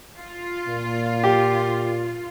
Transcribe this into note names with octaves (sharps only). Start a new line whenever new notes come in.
F4
A#2
G4